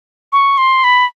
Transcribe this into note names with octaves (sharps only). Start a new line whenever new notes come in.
C#6
C6
B5